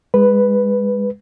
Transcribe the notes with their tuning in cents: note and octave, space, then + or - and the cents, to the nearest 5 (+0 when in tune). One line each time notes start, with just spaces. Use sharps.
G#3 -30 B4 +0